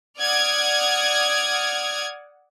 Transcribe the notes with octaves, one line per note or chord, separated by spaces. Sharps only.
D5 F#5 D#6 F6 G#6